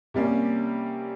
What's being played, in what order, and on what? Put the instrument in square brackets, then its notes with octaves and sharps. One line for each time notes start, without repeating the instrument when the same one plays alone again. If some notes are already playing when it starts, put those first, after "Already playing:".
[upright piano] C3 G3 A#3 C#4